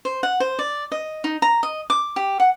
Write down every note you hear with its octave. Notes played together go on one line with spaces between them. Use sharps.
C5
F#5
C5
D5
D#5
D#4
A#5
D#5
D6
G4
F#5